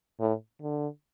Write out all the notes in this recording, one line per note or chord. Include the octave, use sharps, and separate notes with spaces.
A2
D3